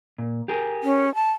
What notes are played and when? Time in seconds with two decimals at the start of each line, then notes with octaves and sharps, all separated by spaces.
0.18 A#2
0.48 G4 G#4 A#4
0.83 C#4
1.15 A5